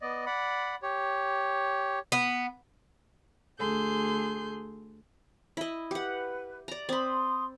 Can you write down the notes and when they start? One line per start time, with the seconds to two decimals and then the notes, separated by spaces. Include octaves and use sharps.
0.01 B3 D5 D#5
0.26 D5 F#5 B5
0.82 G4 C#5
2.12 B3
3.58 D2 G#4 A4 C6 G6
5.57 E4 D#5
5.91 G4 B4 F#5
6.68 D5 A#5
6.89 C4 B5 C6 D#6